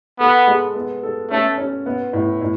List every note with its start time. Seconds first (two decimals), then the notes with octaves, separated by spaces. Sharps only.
0.20 B3 A4
0.47 G#3
0.75 B3
1.03 A4
1.31 A3 C#4
1.58 C#4
1.86 B3
2.13 A2
2.41 A2